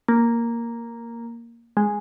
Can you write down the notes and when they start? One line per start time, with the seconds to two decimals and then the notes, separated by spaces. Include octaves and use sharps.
0.08 A#3
1.77 G#3